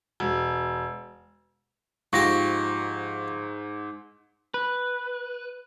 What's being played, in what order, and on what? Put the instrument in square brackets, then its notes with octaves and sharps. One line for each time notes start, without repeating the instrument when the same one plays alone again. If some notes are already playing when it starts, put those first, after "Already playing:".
[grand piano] E1
[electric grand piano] G#2 [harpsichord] F3 G4 [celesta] C#6 A#6
[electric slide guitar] B4